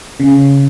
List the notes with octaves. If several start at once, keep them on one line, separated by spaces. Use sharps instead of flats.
C#3